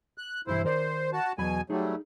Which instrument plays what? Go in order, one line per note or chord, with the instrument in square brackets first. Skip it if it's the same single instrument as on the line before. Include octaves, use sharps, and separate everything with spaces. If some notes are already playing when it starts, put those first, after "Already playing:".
[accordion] F#6
[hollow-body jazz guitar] B1 G2 E3 [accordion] E4 C5
[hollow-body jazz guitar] D#3 A#4 D5 [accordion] C5
[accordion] F#4 A5
[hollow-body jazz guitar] E2 F#3 B5 [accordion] B2 G#5
[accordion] F#3 G3 A3 [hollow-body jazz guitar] D#4 G#4